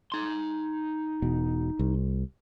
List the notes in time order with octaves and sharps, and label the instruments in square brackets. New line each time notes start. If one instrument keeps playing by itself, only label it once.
[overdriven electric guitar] D#4 C6
[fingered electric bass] E1 B2
C2